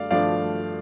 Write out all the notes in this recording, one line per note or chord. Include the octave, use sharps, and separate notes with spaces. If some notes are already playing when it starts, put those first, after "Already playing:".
Already playing: G2 A3 D5 F5
G2 F3 A3 D4 D5 F5